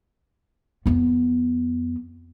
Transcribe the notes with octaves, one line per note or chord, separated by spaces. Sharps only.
F2 B3